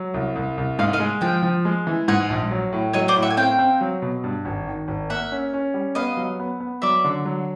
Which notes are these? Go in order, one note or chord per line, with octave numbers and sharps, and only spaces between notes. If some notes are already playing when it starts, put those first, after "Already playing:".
Already playing: F#3
C2
C2
C2
G#2 D#5 F5
D#5 F5
G#3
F3 F5 G5
F3
G#3
E3
G#2 F#5 G#5
A#1
F#3
A2
F#3 C#5 D#5
C5 D5
A2
E5 F#5
G#5
C4 F5 G5
C4
F#3
B2
G2
G#1
D#3
G#1
A#3 E5 F#5
C#4
C#4
G3
B3 D#5 F5
F#3
B3
B3
F#3 D5 E5
D3
F#3